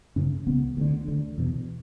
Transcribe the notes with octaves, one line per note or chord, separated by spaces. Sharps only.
F#2 C#3 C#4
C#2 C#3 B3
D2 D3
D2 D3
E2 B2